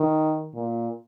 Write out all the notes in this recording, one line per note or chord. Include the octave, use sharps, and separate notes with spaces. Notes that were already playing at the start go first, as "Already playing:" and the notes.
Already playing: D#3
A#2